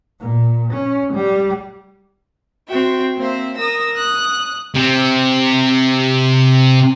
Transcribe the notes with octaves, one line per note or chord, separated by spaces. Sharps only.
A#2
C#4
G3
C4 F#4 E5 G5
A#3 C4 C5 E5
A#4 D#6 E6 A#6
D#6 F#6
C3 C4